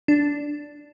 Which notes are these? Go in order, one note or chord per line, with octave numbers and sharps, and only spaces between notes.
D4